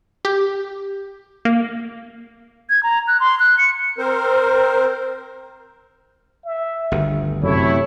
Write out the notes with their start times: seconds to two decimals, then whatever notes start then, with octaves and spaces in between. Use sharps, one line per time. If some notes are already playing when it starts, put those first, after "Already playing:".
0.25 G4
1.45 A#3
2.70 G#6
2.83 A#5
3.07 F#6
3.20 C6
3.40 F#6
3.58 C#7
3.98 C4 A#4 C5
6.46 E5
6.92 G1 D2 D#3
7.43 F#2 C3 A3 E4 C#5